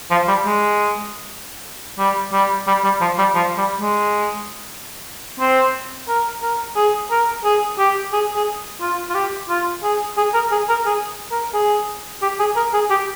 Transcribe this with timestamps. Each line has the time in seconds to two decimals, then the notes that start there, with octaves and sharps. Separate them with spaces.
0.11 F3
0.28 G3
0.45 G#3
1.99 G3
2.33 G3
2.68 G3
2.84 G3
3.01 F3
3.18 G3
3.35 F3
3.58 G3
3.81 G#3
5.40 C4
6.09 A#4
6.42 A#4
6.76 G#4
7.11 A#4
7.44 G#4
7.79 G4
8.13 G#4
8.36 G#4
8.81 F4
9.09 F4
9.15 G4
9.49 F4
9.83 G#4
10.17 G#4
10.34 A#4
10.52 G#4
10.69 A#4
10.86 G#4
11.32 A#4
11.54 G#4
12.22 G4
12.40 G#4
12.56 A#4
12.74 G#4
12.90 G4